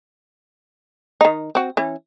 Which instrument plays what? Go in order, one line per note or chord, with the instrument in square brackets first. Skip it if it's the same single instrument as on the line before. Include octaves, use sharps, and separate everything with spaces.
[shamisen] D#3 D#4
C4 F#4
E3 C#4